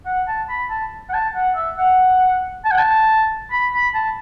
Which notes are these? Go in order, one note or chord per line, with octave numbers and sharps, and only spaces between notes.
F#5
A5
B5
A5
F#5
A5
F#5
E5
F#5
A5
F#5
A5
B5
B5
A5